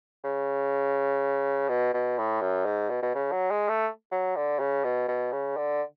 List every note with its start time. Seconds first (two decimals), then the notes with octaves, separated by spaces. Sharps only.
0.24 C#3
1.69 B2
1.94 B2
2.18 A2
2.42 F#2
2.66 G#2
2.90 B2
3.02 B2
3.15 C#3
3.32 F#3
3.51 G#3
3.69 A3
4.12 F#3
4.36 D3
4.59 C#3
4.84 B2
5.08 B2
5.32 C#3
5.57 D3